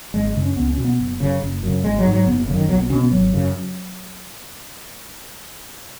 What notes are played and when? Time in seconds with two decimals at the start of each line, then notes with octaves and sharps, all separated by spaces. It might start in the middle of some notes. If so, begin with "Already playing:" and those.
0.14 G#1 G#3
0.28 G#3
0.35 F#2 C#3
0.42 C#4
0.56 C#2 B3
0.70 C#4
0.77 B2
0.85 B3
0.99 F#1
1.20 F#2 C#3
1.42 F#1
1.63 F#2 C#3
1.83 G#1 G#3
1.98 F#3
2.05 G#2
2.12 F#3
2.26 F#1 B3
2.47 C#3
2.50 F#2 D#3
2.68 B1 F#3
2.79 B3
2.90 B2 C#4
3.01 B3
3.11 G#1 F#3
3.33 F#2 C#3